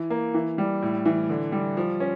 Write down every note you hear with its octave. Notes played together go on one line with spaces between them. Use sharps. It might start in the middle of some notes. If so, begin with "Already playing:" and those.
Already playing: E3
A#3
E3
G3
A2
E3
D3
G3
F3
C#4